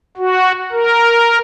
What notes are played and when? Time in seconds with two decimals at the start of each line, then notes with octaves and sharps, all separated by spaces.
0.17 F#4
0.72 A#4